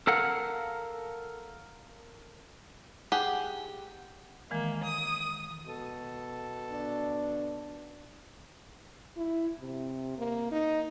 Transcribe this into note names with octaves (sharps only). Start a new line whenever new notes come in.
A4 A#4 F5 F#5
G4 G#4 F#5
D#3 E3 G#3 A#3
D#6
B2 A4
D4
E4
C3
A#3
D#4